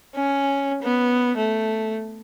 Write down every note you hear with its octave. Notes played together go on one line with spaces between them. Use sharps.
C#4
B3
A3